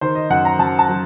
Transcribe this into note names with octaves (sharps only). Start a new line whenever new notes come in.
D#3 C5
D#5
F#2 F#5
A#5
F#2 A5
A5
F#3